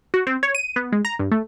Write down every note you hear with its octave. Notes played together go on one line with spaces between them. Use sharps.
F#4
C4
C#5
D#7
B3
G#3
A#5
G2
A3